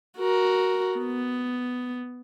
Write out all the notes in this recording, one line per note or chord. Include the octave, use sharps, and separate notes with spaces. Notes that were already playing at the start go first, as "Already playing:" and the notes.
F#4 A#4
B3